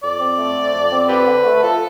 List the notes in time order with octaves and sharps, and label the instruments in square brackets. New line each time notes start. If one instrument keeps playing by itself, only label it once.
[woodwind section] F2 [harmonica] D5
[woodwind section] C4
A3
D3
F2
C4
[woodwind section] D3 [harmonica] G4 B4
[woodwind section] D3
A3
[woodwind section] F3 [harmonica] A4